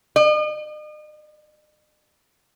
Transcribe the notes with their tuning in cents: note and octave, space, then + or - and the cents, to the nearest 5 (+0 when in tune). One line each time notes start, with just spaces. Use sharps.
D#5 -40